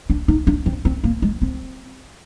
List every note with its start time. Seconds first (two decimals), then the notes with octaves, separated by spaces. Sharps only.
0.10 D4
0.28 D#4
0.47 D4
0.66 C4
0.85 C4
1.04 A#3
1.22 G#3
1.42 C4